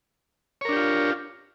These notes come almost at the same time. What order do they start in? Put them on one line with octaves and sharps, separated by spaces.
C#5 A#4 D4 G4 F4